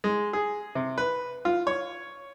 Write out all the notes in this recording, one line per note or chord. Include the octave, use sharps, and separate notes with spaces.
G#3
G#4
C3
B4
F4
C#5